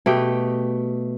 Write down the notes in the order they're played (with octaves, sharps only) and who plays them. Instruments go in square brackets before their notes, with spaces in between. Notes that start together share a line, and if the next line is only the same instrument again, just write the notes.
[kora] B2 A3 G4 G5